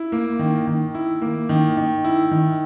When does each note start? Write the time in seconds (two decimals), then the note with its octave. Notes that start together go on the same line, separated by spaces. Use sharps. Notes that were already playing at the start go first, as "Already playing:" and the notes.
Already playing: E4
0.12 A#3
0.39 D#3
0.67 D#3
0.94 E4
1.22 A#3
1.49 D#3
1.77 D#3
2.04 E4
2.31 D#3